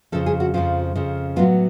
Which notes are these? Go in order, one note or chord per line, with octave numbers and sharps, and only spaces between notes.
F2 C#3 F3 A4
G#4
F#4
F2 C#3 F3 F4
F2 C#3 F3
A2 F#3 B3 F4